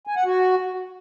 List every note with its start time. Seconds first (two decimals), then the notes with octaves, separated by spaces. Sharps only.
0.07 G#5
0.16 F#5
0.25 F#4